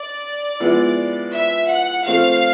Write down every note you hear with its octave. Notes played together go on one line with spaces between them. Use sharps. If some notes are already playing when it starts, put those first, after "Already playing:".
Already playing: D5
F3 G#3 B3 E4
E5
F#5
F3 A3 C4 F5